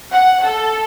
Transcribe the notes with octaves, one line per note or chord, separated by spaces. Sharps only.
F#5
A4